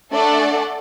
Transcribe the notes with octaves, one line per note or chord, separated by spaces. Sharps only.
A3 D4 A4 D5 F#5